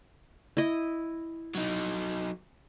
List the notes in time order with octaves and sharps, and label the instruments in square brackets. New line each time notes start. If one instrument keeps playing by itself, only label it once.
[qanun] E4 D#5
[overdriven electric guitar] F#3 D#4